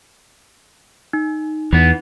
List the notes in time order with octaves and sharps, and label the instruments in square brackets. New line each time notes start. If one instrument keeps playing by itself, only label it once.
[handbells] D#4
[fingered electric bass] E2 [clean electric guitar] E3 B3